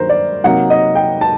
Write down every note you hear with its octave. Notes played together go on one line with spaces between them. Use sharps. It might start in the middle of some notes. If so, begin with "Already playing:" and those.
Already playing: G2 D#3 F#3 A#3 A#4 C5
D5
C3 F#3 A#3 D#4 F#5
D#5
G5
A5